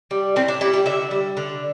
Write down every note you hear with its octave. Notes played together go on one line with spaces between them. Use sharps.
G3
A2 C4
D4
G3 E4
G4
D3 E5
G3
D3